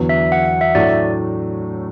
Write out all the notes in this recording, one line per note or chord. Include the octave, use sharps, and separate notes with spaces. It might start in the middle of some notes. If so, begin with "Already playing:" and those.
Already playing: E2 D3 F#3 B3
E5
F#5
F#5
E5
A2 F#3 A3 D4 D5